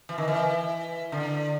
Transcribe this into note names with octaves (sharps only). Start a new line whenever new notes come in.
E3
D#3
E3
D3